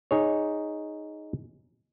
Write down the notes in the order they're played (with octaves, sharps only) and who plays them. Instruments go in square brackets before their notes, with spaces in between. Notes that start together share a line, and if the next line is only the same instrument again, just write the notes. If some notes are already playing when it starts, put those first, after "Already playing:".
[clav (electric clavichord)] D#4 G#4 C#5